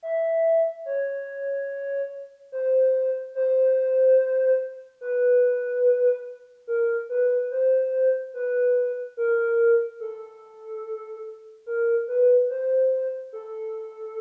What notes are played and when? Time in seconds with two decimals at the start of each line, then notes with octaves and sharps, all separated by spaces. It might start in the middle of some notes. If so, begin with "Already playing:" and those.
0.03 E5
0.86 C#5
2.52 C5
3.35 C5
5.01 B4
6.67 A#4
7.09 B4
7.51 C5
8.34 B4
9.17 A#4
10.00 A4
11.66 A#4
12.08 B4
12.49 C5
13.33 A4